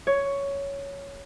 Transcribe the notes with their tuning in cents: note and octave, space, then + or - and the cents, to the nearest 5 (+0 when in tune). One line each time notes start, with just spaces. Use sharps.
C#5 +10